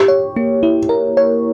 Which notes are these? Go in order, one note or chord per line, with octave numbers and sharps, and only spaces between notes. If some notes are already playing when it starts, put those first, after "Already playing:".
Already playing: G4
C#5
A#3
E4
A#4
C#5